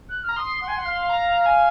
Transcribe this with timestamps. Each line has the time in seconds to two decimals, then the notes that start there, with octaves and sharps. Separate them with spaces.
0.09 F#6
0.22 F6
0.29 A#5
0.36 C6 D#6
0.61 F#5
0.68 G#5
0.75 F#5
0.85 F5
1.09 A#5
1.41 A#5
1.46 G#5